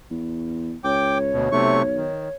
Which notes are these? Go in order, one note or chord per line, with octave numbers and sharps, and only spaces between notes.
E2
C#2 C#5 G5 D6
D2 B2
B1 C3 A3 C#6
D#3